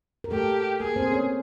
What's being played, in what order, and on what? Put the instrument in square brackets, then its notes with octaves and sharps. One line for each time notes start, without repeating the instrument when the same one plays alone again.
[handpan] A#4
[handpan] A3 A4 [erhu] G4
[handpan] A#3 A#4 [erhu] G#4
[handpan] C4 C5
C#4 C#5